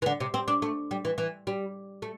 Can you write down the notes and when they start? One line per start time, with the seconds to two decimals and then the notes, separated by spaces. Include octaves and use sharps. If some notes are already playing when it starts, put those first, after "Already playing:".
0.02 E3
0.06 D3
0.20 C3
0.34 C4
0.48 D4
0.62 A3
0.91 G3
1.05 E3
1.18 E3
1.47 G3
2.02 A3